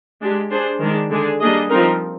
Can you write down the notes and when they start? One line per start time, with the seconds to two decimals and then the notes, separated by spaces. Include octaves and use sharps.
0.21 G#3 D4 G4
0.51 D4 G#4 C5
0.80 D#3 G#3 D4
1.10 D3 G#3 D4 G#4
1.41 G3 A#3 D4 G#4 D#5
1.69 F3 C4 D#4 A#4